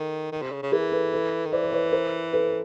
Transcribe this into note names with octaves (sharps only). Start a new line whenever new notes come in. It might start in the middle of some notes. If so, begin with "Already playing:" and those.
Already playing: D#3 A4
D#3
C3
C#3
C#3
E3 G#4 A#4
A4 B4
A4 B4
D#3
E3 C5 D5
C5
B4 C#5
A#4 C5
A4 B4